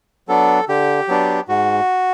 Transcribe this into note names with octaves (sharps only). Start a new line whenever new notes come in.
F#3 B3 D4 A4
D3 G4
F#3 B3 D4
G#2 F#4